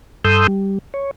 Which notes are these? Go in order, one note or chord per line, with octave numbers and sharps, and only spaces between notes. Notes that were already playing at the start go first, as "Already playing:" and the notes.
G2 A4 C6 D#6 E6 G6
G3
C#5